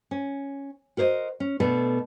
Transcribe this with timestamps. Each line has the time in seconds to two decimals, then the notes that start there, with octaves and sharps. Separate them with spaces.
0.11 C#4
0.97 F#4 A#4 C5 C#5 D#5
1.40 C#4
1.60 B2 A3 B3 D4 A4